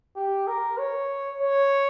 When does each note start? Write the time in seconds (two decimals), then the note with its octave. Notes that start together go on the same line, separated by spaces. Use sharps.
0.16 G4
0.47 A#4
0.78 C#5
1.41 C#5